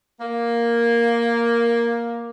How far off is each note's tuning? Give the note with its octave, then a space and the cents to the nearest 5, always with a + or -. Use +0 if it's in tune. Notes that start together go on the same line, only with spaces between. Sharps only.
A#3 +5